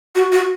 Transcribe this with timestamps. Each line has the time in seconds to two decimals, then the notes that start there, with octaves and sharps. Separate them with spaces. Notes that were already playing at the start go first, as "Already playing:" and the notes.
0.15 F#4
0.32 F#4